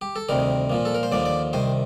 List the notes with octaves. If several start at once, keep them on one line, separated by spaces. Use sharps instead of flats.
G4
A4
D2 C3 D#3 G3 A#4
A#2 F3 A#3
A4
A#4
C5
D#2 D3 F3 A#3 D5
D5
C2 C3 D#3 C5